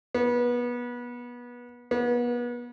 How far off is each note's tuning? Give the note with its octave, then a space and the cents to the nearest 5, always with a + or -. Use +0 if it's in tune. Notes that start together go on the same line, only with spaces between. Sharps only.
B3 -25
B3 -35